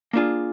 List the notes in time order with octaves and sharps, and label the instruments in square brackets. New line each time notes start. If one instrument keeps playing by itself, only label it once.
[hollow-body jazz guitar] A#3 D4 F4 G#4